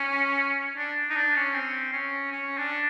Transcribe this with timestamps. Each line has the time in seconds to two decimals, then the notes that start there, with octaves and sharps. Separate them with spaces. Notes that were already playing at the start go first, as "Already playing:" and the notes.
Already playing: C#4
0.77 D4
1.10 D#4
1.16 D4
1.36 C#4
1.54 C4
1.93 C#4
2.32 C#4
2.57 D4